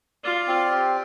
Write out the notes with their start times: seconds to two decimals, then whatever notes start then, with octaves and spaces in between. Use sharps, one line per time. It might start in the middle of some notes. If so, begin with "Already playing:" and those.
0.24 F4 D5
0.47 C4
0.71 G4